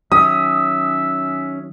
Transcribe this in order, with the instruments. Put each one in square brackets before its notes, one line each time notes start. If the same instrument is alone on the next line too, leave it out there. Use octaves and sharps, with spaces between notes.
[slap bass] D#3 F#3 [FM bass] C#4 [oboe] E5 [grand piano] D#6